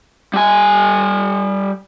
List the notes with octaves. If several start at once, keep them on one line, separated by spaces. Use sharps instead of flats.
G3 G#5